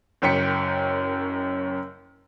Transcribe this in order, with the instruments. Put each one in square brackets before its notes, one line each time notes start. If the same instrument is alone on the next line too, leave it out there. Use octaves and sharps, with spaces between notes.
[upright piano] F#1 F#2 C#4 G5 B6 C#7